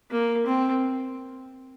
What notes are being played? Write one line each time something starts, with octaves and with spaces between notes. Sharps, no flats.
A#3
C4